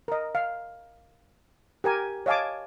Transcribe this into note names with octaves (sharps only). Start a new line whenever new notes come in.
A#4 D#5
F5
G4 A#4 G#5
C#5 D#5 F5 G#5 A5 D6